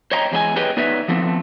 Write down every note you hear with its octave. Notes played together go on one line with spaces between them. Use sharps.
C5 C#5 D#5 G5 A#5
E2 G#3 D#4 G#5
G4 G#4 B4 C#5 D#5 G5
B3 D#4 B4 C#5 D5 E5
F3 A3 B3 C4